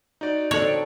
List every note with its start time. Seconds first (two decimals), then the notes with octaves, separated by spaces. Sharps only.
0.21 D#4 F#4 D5
0.51 D3 C4 D4 A4 C#5